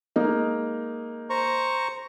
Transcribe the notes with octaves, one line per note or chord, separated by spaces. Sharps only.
G#3 A#3 D#4
C5 A#5 C#6